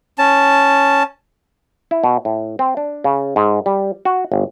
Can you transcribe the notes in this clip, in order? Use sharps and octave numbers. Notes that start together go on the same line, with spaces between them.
C#4 A5
E4
B2
A2
C4
D4
C#3
G#2
G3
F#4
G1